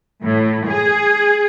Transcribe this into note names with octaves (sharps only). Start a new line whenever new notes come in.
A2
G#4